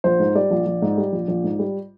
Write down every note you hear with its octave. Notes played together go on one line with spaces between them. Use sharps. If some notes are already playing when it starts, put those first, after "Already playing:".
A#1 C5
G#2
G3 D5
A#1
A#1
G#2
G3
A#1
A#1
G#2
G3